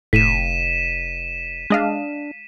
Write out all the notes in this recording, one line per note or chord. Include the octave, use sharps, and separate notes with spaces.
F1 A2 B6 D#7 E7
G#3 D4 D#5 F5